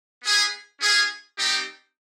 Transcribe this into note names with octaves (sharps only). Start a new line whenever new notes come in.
B3 E4 G#4
C#4 F4 G#4
G3 C4 D#4 G4